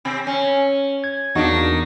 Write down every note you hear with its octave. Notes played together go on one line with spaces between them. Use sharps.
C3 C4
C#4
G#6
E2 A#3 D4 D#4 F#4